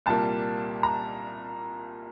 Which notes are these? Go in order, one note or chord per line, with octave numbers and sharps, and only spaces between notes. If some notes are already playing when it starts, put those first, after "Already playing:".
C2 A#2 G3 A#3 A5
A#5